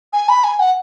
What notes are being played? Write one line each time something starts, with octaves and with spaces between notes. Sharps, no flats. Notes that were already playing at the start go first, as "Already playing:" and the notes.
G#5
B5
G#5
F#5